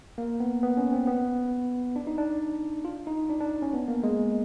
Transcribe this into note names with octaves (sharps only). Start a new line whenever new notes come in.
A#3
B3
B3
C#4
C4
B3
D4
D#4
D4
F4
D#4
D4
D4
C#4
B3
A#3
G#3